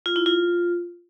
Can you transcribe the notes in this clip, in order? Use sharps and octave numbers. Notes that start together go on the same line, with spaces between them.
F4
E4
F4